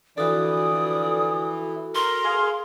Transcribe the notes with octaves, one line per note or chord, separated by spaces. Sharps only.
D3 E3 F3 F#4 A4 D5 D#6
A#4 A#5 C6
G#4 F5